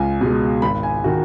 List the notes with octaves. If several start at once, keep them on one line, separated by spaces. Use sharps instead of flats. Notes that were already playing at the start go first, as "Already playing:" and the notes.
Already playing: C#2 G#5
B2 G#3
G#1 B5
G#5
D#3 F#4